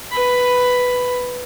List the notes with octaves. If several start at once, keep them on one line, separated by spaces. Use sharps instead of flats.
B4 B5